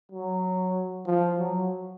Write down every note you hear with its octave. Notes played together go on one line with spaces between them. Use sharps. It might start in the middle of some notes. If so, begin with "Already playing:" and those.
F#3
F3
F#3